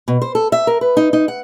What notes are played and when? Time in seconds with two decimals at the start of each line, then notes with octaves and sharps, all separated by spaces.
0.08 B2
0.22 C5
0.35 A4
0.52 E5
0.67 A#4
0.81 B4
0.97 D#4
1.13 D#4
1.28 F#5